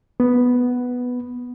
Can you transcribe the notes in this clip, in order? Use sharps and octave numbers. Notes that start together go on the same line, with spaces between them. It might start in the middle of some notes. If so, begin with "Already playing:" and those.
B3